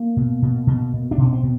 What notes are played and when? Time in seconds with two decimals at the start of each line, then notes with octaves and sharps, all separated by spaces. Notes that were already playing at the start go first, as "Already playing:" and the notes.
Already playing: A#3
0.17 B2
0.42 B2
0.67 B2
0.93 B2
1.11 D4
1.18 B2 C#4
1.33 C4
1.43 B2